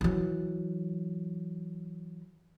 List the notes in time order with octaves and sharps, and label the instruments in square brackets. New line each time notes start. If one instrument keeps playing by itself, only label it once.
[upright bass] E3 F#3